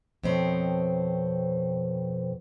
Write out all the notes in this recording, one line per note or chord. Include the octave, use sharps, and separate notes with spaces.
F2 B2 C4 C#5